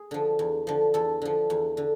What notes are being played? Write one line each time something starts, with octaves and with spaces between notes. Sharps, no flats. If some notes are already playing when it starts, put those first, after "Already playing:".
Already playing: G#4
D3 F3
E2
D3 F3
E2 A4
D3 F3
E2
D3